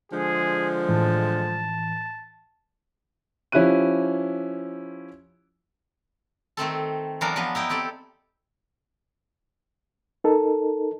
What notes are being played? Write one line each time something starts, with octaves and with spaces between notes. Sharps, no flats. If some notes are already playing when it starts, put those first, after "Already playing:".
D3 F3 G#3 G#4
A2 E3 A5
F3 C#4 E4 G4 F#6 D#7
D#3 A3 C4 A4
E3 F#3 B3 D4 A#4
F3 F#3 B3 D4 B4
D#4 E4 G5
C4 G4 A4 D5
D#4 A4 A#4